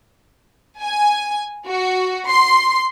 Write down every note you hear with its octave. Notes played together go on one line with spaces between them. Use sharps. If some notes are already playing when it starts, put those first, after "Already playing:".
G#5
F#4
C6